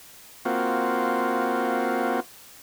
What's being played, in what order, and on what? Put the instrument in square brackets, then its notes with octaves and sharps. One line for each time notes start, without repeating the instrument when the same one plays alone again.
[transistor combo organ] A#3 C4 F4 F#4